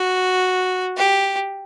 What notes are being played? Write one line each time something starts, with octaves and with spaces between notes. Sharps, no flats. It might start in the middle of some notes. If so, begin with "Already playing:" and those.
Already playing: F#4
G4